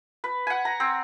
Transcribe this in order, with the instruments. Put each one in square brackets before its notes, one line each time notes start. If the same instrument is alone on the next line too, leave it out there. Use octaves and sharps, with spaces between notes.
[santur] B4
F#5 G#5
A#5
C4